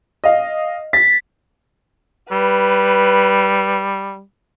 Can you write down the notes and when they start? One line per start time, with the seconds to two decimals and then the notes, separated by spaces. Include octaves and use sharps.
0.24 D#5 F5
0.93 A6 B6
2.31 G3 B4